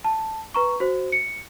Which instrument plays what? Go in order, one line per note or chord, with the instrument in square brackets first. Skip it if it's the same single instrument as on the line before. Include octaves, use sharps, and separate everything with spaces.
[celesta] A5
B4 A#5 C#6
F#4 C5
C#7